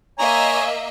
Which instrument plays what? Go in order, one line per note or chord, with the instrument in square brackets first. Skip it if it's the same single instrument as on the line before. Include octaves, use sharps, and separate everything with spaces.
[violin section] A#3 D#5 E5 [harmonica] C#5 G#5 A#5